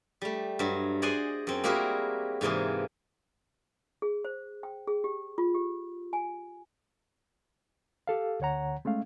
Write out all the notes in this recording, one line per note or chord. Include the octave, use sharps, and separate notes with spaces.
G3 A3
G2 F#3
G#4 C5 D5 D#5 F#5 G#5
F#2 C4
G3 A#3 E4 F#4 G#4 A#4
G#2 C3 E3 A#3 G#4
G#4
C5
G5
G#4
G4
F4
G4
G#5
G4 A4 F5
D2 D3 C#5 F#5 A#5
G#3 A3 C#4 F5